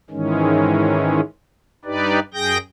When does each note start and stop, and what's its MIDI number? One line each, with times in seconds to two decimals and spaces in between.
0.10 1.21 44
0.10 1.21 51
0.10 1.21 52
0.10 1.21 56
0.10 1.21 61
1.85 2.19 43
1.85 2.19 63
1.85 2.19 67
1.85 2.19 71
1.85 2.19 74
2.34 2.58 42
2.34 2.58 68
2.34 2.58 79
2.34 2.58 91
2.34 2.58 94